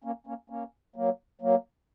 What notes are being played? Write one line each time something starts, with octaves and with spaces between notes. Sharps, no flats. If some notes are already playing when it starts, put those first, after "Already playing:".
A#3 C#4
A#3 C#4
A#3 C#4
F#3 A#3
F#3 A#3